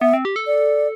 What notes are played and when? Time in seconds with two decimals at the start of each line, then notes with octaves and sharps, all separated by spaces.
0.01 B3 E5
0.13 C4
0.25 G4
0.36 A4
0.47 D5